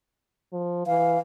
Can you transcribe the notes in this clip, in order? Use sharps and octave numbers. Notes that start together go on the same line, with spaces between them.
F3
E3 F5